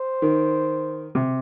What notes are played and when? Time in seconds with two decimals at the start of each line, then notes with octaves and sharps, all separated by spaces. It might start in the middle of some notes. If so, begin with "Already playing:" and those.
Already playing: C5
0.22 D#3
1.15 C3